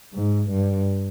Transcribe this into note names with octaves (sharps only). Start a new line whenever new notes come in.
G#2
G2